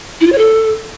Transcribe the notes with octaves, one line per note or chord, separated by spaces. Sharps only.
E4
F4
C#5
A4